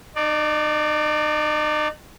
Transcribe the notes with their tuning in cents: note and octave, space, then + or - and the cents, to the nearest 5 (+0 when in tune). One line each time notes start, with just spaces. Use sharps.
D#4 -40 D5 +0